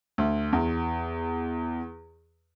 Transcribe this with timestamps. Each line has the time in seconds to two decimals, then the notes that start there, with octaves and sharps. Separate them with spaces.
0.18 D2
0.53 E2